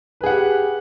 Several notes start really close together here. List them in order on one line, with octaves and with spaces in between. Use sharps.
B4 G#4 F#5 G4